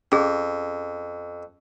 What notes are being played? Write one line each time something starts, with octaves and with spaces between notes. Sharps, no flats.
F2 C#4 G#4